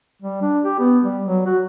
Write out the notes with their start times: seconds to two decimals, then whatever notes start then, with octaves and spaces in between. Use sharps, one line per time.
0.22 G3
0.42 D4
0.64 G4
0.79 B3
1.03 G3
1.26 F#3
1.46 F#4